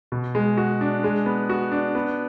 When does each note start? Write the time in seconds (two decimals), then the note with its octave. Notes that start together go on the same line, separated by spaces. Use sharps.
0.12 B2
0.35 G#3
0.57 F#4
0.81 D4
1.04 G#3
1.26 B3
1.49 F#4
1.72 D4
1.95 B3